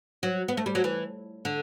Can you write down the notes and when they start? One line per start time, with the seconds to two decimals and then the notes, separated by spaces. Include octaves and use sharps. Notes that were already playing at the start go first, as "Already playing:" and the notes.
0.23 F#3
0.48 B3
0.57 A3
0.66 G3
0.75 F#3
0.84 E3
1.45 D3